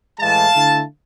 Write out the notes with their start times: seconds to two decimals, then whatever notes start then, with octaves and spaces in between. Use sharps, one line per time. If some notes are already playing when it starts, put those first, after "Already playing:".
0.19 A2 E3 G#3 F5 A5
0.55 D3 A3 E4